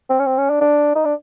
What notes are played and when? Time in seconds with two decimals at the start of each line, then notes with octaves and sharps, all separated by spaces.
0.10 C4
0.20 C#4
0.26 C4
0.38 C#4
0.50 D4
0.61 D4
0.96 D#4
1.05 D4